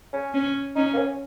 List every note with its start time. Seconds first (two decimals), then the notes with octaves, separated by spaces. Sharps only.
0.13 C#4
0.34 C#4
0.75 C#4 D#4
0.94 A#3
0.97 C#4